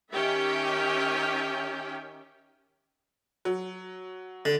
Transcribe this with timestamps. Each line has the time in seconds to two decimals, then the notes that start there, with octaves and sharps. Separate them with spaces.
0.13 D#3 C#4 G4 E5 G5
3.45 F#3
4.45 D3